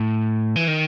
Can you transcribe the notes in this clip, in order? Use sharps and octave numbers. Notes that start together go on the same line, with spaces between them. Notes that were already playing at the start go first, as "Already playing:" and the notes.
Already playing: A2
E3
D#3